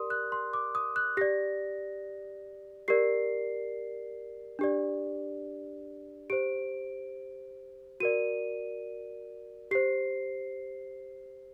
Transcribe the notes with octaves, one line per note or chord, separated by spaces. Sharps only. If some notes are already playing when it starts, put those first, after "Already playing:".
Already playing: G4 A#4 D5 C6 D#6
F#6
C6
D6
D#6
F#6
G4 D5 A#6
G4 A#4 D5 C7
D4 G4 D5
G4 C5 D7
F#4 A#4 D5 D#7
G4 C5 C7